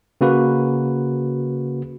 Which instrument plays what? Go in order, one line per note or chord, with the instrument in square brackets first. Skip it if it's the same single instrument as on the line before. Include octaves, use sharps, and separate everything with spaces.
[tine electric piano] C#3 A#3 F#4 B4